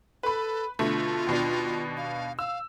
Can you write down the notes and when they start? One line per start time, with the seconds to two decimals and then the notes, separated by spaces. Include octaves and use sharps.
0.23 A4 B4 B5
0.79 B2 D3 A3 F4
1.27 D#2 B2 D4
1.97 F5
2.39 F5 E6